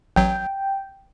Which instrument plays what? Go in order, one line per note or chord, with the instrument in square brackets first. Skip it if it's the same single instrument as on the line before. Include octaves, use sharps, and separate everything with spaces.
[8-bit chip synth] A1 F#3 [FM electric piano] G5